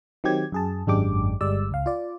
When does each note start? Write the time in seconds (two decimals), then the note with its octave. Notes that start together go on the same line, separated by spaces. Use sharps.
0.24 D#3 F#3 C4 G4 G#6
0.52 F#2 G#4 A5
0.87 G#1 F#2 G#3 D4 G4 D6
1.41 G1 G3 G#3 D5 E6
1.71 C#2 F5
1.86 F4 D5